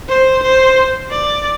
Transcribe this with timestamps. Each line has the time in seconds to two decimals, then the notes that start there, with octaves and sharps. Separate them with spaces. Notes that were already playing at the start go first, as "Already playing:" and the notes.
0.09 C5
0.43 C5
1.11 D5